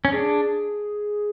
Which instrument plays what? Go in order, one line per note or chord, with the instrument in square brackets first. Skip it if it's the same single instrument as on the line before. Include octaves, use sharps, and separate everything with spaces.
[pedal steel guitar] C#4
[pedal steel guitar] D4 [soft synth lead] G#4